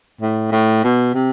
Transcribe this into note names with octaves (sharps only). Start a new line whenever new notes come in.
A2
A2
B2
C3